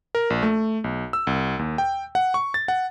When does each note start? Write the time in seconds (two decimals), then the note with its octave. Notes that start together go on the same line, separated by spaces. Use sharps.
0.15 A#4
0.30 A#1
0.43 A3
0.84 B1
1.13 E6
1.27 C2
1.59 D#2
1.78 G5
2.15 F#5
2.34 C#6
2.54 A6
2.68 F#5